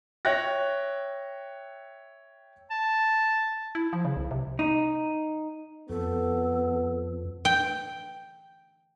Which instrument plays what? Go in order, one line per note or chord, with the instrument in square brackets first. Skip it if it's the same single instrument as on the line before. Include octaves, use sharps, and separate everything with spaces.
[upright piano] C#5 E5 G5 F#6 A#6
[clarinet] A5
[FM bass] E4
F3
C#3
C2
C3
[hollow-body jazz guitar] D#4
[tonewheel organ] F2 [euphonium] B3 [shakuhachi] A4
[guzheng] G5